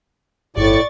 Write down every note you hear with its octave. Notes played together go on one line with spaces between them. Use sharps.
G1 A2 D5 C#6 A6